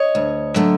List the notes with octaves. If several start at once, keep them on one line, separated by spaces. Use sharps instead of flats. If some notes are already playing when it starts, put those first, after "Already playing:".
Already playing: C#5 D#5
D2
D3 F#3 A3